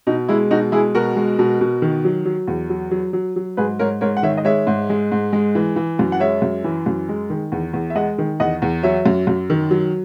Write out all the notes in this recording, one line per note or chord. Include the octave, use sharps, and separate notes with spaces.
B2 D#4
G#3 E4
B2 D#4 F#4
G#3 E4 G#4
B2 F#4 A#4
G#3
B2
B2
D#3
F#3
F#3
E2
F#3
F#3
F#3
F#3
G#2 G#4 B4
G#2 A#4 C#5
G#2 A#4 C#5
F#5
D#3 C#5 E5
D#5
G#3 C#5 E5
G#2
G#3
G#2
G#3
E3
E3
F#2
F#5
G#3 C#5 E5
F#2
E3
F#2
G#3
D#3
E2
E2
E5
G#3 D#5 F#5
D#3
E2 D#5 F#5
E2
F#3 C#5 E5
F#2
F#2
D#3
F#3